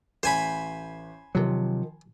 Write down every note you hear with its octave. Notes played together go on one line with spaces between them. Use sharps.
A1 C5 G#5 B5
C3 D#3 F3 F#3